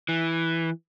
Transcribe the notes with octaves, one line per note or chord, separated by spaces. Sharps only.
E3